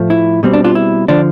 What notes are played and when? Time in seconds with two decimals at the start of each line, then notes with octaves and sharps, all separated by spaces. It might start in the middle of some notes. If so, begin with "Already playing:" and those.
Already playing: A2 F3 A3
0.10 E4
0.43 B2 G3 C4
0.53 D4
0.64 D4 F4
0.75 E4
1.08 D3 F3 D4